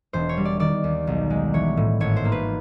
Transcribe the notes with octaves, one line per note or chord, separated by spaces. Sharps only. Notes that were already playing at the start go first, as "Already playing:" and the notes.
E1 C5
C#5
G3
D5
D#3 D5
D#2
B1
G#3
E3 C#5
A2
G#1 C#5
C5
A#3
B4